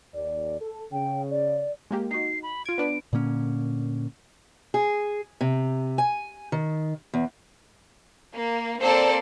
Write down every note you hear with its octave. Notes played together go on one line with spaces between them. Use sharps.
D#2 D5
A4
C#3 G5
D5
G#3 A#3 G4
D#4 F#4 C7
B5
F4 G#6 D7
B3 D4 B4
A#2 D3 A#3 C#4
G#4
C3
G#5
D#3
E2
A#3
A#3 C4 A4 C5 D5